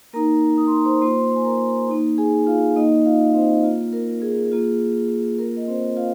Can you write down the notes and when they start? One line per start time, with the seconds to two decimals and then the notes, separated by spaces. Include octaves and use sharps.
0.13 A#3 D#4 A#4 A#5
0.57 D#6
0.67 C6
0.77 A#5
0.85 C5 C6
1.01 A#3 F4 C5 C6
1.36 G#5
1.45 A#4 A#5
1.89 A#3 D#4
2.18 G#4 G#5
2.47 F4 F5
2.76 A#3 D#4 D#5
3.05 F4 F5
3.30 D#5
3.34 C4 C5
3.63 A#3 F4
3.93 A#4
4.22 G#4
4.52 A#3 F4
5.39 A#3 F4 A#4
5.57 D#5
5.68 C4 C5
5.97 F4 F5